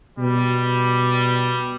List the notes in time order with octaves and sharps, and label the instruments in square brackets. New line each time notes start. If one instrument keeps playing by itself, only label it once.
[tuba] B2 [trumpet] G3